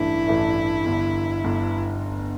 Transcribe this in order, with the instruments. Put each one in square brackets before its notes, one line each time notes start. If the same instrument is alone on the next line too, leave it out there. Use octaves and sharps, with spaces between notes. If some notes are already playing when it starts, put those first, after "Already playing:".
Already playing: [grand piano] A1 G2 E3 A3 D4 [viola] E4
[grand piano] A1 G2 E3 A3 D4
G1 G2 D3
G1 G2 D3